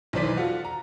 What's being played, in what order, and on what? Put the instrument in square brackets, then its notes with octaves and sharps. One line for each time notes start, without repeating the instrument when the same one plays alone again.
[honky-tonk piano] B1 D#3 E3 C5 D5 B6
F4 F#4 A4
A#5